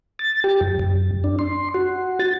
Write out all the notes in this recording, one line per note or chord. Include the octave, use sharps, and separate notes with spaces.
A6
G4
F#2
F#2
D4
C6
F#4
A6